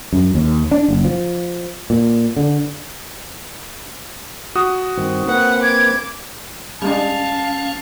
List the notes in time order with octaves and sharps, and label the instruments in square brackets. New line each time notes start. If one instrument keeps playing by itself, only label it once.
[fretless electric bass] F#2
D#2
D4
F#1
F3
A#2
D3
[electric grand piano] F#4 D#6
[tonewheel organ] G2 D#3 C4
[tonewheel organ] A#3 C4 B4 [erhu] F#5
[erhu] D6 [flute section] G#6
[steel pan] G3 G#3 D4 [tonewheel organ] C#4 [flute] F5 [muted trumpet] A5